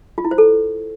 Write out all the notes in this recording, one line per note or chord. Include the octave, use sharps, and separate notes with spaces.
F4
E4
C5
A4